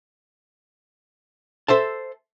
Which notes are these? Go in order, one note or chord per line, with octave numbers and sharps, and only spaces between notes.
A4 C5 E5 A5